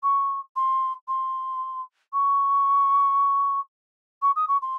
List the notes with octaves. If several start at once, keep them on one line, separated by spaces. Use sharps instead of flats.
C#6
C6
C6
C#6
C#6
D#6
C#6
C6